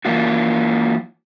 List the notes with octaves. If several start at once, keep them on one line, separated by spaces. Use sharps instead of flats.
E3 F#3 A#3 F4 F#4